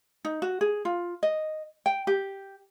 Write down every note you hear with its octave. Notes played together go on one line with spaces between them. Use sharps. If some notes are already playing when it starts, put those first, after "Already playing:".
D#4
F#4
G#4
F4
D#5
G5
G4